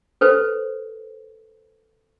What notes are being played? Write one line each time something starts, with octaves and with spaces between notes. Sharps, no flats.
A4 B4 C5